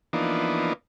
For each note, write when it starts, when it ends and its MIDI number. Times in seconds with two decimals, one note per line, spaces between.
0.13 0.73 52
0.13 0.73 53
0.13 0.73 58
0.13 0.73 59
0.13 0.73 62
0.13 0.73 63